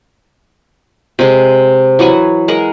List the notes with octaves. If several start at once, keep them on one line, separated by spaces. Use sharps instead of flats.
C3 G#3
E3 F#3 F#5 G#5
G#3 A#4 F#5